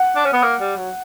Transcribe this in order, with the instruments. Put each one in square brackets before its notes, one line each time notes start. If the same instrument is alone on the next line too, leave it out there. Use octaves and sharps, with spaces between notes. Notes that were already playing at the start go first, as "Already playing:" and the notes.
Already playing: [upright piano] F#5
[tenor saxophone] D4
C#4
B3
A#3
G3
F#3